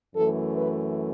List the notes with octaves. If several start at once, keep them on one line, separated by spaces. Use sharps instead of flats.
F#2 E3 A3 A4
B4